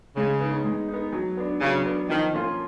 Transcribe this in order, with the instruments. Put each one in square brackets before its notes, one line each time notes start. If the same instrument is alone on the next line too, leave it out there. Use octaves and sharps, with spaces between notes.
[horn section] C#3 [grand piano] G#3
[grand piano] B3 D#4
G#3
B3 D#4
F#3
B3 D4
[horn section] C#3 [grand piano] F#3
[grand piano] B3 D4
[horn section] D#3 [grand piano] F3
[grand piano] A#3 C#4 F4